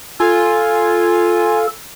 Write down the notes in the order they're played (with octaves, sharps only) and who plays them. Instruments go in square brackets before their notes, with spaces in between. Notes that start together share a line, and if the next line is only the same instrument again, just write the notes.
[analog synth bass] F4 [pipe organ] A4 [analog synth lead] G#5